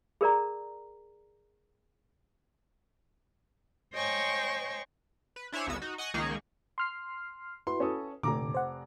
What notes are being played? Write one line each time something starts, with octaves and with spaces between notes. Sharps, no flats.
G#4 A#4 D5 A#5
C5 C#5 D#5 G5 G#5 C#6
B4
D4 E4 C5 C#5 G#5
G#1 C#2 B3 F#4 E6
D#4 F#4
D#5 F#5 G#5 C#6 D#6
C#2 D#3 A#3 D#4 G#4 C#6
C6 F6 C7
E4 F#4 B4 C6
C#4 A4 D#6
F1 A#2 D3 A#5 D6
C5 F#5